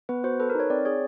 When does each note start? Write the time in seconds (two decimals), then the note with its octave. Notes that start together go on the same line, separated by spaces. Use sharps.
0.09 B3 B4
0.24 F#4 C5
0.40 A4 B4
0.50 A#4
0.55 D#4 C#5
0.70 C4 D5
0.85 G#4 C#5